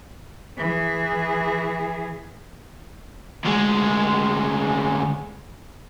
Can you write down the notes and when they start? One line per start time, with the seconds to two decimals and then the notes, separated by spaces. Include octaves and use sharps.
0.57 E3 G#4
3.45 D2 G#3